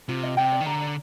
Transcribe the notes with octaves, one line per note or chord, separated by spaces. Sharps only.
C3 F4
D#5
C3 G5
D5
D#3
D3 A#5
D5